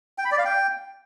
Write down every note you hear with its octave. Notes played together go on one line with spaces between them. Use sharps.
G5
B5
D5
F5
G5